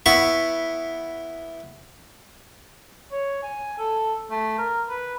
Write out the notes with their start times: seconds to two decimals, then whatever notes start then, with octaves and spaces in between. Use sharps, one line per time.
0.06 B3 E4 C#6
3.12 C#5
3.43 G#5
3.78 A4
4.31 A3
4.58 A#4
4.89 B4